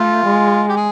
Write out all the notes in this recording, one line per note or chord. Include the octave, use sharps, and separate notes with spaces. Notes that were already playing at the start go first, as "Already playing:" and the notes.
Already playing: A3 F4
G#3
G4
G#4